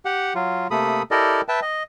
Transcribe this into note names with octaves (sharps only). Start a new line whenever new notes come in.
G4 F#5
F#3 F4
C3 A3 A#3 A4 B5 D#6
E4 G4 A4 A#4 D5 D#5
B4 E5 G5 A5
D#5